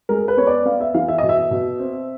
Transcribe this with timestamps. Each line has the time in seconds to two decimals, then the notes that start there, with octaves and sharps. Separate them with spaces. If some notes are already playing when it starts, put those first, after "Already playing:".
0.09 G#3 A#4
0.28 B4
0.37 B3 C#5
0.47 D5
0.65 B3 F5
0.81 E5
0.94 E3 F5
1.08 E5
1.18 B2 D#5
1.29 E5
1.51 B2
1.79 C4